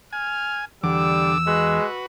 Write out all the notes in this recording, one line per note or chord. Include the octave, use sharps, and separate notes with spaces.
G#5 F6
E2 D3 G3 D6 E6
G#3 F#4 B4